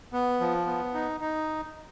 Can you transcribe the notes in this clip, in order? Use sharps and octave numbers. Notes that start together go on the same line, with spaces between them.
B3
F3
B3
D#4
D#4